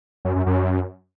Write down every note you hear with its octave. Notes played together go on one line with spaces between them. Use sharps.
F#2
F#2
F#2